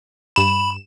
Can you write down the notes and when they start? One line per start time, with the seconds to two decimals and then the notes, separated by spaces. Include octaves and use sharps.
0.36 G2 B5 E7